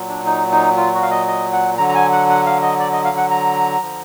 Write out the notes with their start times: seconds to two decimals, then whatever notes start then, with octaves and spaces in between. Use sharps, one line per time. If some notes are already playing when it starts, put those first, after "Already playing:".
Already playing: A#2 F#3
0.09 D4
0.26 D#4
0.52 D#4
0.77 F4
0.94 F#4
1.03 F5
1.11 D#5
1.28 D#5
1.53 F#5
1.78 D3 F#3 A#5
1.89 A#5
1.95 G#5
2.12 F#5
2.29 F#5
2.46 F5
2.62 D#5
2.79 D5
2.93 D#5
3.05 F5
3.17 F#5
3.31 A#5
3.81 D3 F3